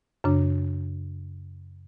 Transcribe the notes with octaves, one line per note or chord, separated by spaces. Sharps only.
F#2 C#3 D4